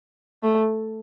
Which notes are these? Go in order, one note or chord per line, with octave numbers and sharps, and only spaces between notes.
A3